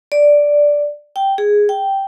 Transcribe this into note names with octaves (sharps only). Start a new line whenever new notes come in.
D5
G5
G#4
G5